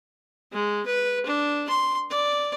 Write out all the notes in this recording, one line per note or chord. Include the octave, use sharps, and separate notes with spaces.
G#3
B4
D4
C6
D5